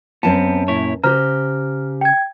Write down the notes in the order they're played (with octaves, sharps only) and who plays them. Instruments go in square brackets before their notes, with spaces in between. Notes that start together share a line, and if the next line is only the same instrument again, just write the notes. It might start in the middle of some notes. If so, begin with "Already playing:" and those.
[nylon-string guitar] F#2 A5 [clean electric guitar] B3 C4
[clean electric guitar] A#2 E4 C#5
[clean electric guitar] C#3 [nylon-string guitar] G4 C5 [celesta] A#5 F6
[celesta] G5 G#6